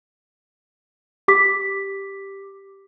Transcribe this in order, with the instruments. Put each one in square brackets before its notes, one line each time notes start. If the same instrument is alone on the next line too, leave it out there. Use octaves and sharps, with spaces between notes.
[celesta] G4 D6 B6